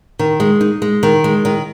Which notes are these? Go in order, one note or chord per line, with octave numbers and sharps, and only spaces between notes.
D#3
G#3
D#4
G#3
D#3
G#3
D#3